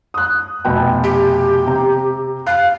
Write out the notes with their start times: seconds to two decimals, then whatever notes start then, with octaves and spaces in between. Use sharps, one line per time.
0.14 D#6 F#6
0.65 F1 B2 G5
1.04 G4
1.67 C3 A#5
2.47 F5 F#6